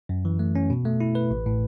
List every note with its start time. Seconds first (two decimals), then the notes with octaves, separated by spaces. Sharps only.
0.09 F#2
0.25 E3
0.39 A3
0.55 C#4
0.70 B2
0.85 A3
1.01 E4
1.15 B4
1.31 A1
1.46 A2